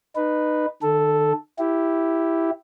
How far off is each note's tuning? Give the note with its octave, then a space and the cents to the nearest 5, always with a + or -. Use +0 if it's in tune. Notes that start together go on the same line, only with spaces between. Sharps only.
D#4 -25 B4 +0
D#3 -45 A4 +0
E4 +0 G4 +0